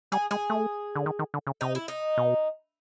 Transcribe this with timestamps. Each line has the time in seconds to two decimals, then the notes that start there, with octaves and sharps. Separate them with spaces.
0.12 G3 G#4
0.31 G#3 G#4
0.50 A3
0.95 D3
1.06 D#3
1.19 D#3
1.34 D3
1.47 C#3
1.61 C3 D#4
1.75 E4
1.88 D#4
2.18 B2